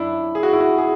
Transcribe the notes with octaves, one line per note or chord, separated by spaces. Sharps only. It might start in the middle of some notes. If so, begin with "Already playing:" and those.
Already playing: F#2 D4 E4
G#4
F#4
E4
F#4
G#4